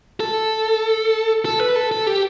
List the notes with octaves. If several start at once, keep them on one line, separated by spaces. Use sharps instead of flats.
A4
A4
B4
A4
A4
G4